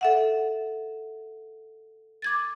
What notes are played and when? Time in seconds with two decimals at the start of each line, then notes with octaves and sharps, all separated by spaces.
0.01 A4 E5 F#5
2.22 D6 G#6 A6